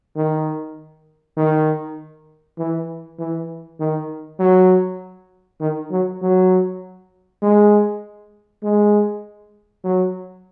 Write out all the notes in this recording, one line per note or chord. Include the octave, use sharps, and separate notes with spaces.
D#3
D#3
E3
E3
D#3
F#3
D#3
F#3
F#3
G#3
G#3
F#3